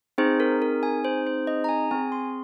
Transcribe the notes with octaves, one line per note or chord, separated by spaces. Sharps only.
C4 D#4 G#4 C5
A#4
A#4
G#5
C5
C5
D#5
A#5
G#5
C4 G#4 G#5
C6